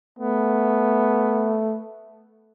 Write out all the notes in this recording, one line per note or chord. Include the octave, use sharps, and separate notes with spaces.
A3 B3